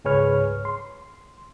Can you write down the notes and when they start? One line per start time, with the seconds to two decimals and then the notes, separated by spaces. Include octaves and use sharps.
0.04 C#2 G#2 G#4 B4 C#5 F6
0.65 C6